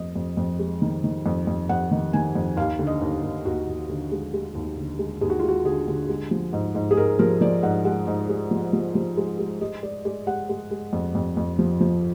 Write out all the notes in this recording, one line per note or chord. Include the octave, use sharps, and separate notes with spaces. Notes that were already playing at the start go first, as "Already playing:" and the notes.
Already playing: F2 D#5
F2
F2
G#3
D#3
D#3
F2
F2
F2 F#5
D#3
D#3 G#5
F2
D#2 F5
D3
D#5
D#2
D#2
D#2 F#4
D#2
D3
G#3
G#3
D#2
D3
G#3
D#2 G#4
F#4
G#3 F4
F#4
D3 G#4
D3
G#3
F3
G#2
G#2
G#4
G#2 A#4
F3 A#4
F3 D5
G#2 F#5
G#3 F#5
G#2
G#3
F3
F3
F3
G#3
G#3
G#3 D#5
G#3 D5
G#3 D5
G#3 F#5
G#3
G#3
F2
F2
F2
F3
F3